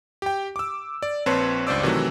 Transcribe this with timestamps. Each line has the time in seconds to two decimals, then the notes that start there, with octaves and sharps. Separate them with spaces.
0.22 G4 G5
0.56 D6 E6
1.03 D5
1.26 A#1 C4 B4 C#5 A5 C6
1.67 C#2 G2 C5 D5 D6 E6
1.83 C3 D#3 E3 F#3 A3